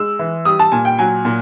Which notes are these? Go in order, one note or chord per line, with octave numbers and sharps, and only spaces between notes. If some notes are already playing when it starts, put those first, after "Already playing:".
Already playing: G#3 E6
E3
G3 D#6
A5
A#2 G#5
G5
F#3 G#5
A#2